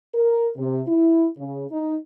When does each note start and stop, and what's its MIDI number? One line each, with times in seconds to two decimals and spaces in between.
0.14 0.48 70
0.57 0.81 48
0.87 1.26 64
1.37 1.64 49
1.71 1.96 63